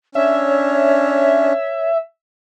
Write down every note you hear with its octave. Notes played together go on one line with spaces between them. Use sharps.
C#4 D4 C#5 E5